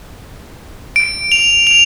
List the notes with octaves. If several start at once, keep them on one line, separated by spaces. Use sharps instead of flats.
D7
F7
F7